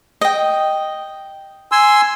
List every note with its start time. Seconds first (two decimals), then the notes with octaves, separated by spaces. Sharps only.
0.21 D#5 G5
1.72 G#5 C6 E6